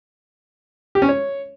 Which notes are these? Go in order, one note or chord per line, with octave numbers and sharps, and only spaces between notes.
G4
C#4
C#5